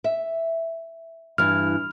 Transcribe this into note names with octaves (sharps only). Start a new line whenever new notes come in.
E5
G2 E3 F6